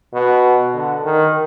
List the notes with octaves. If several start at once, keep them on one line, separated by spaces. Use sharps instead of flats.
B2
D3
D#3